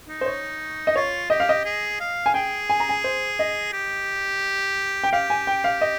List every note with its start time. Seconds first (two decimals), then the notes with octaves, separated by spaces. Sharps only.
0.08 D#4
0.21 C5
0.26 C#5
0.87 D#5
0.96 F4 C#5
1.30 G4 D#5
1.40 F5
1.49 D#5
1.65 G#4
2.00 F5
2.26 G#5
2.34 G#4 G5
2.70 G#5
2.80 A#5
2.89 G#5
3.04 C5
3.39 D#5
3.73 G4
5.03 G5
5.12 G4 F5
5.30 G#5
5.47 G5
5.64 F5
5.81 D#5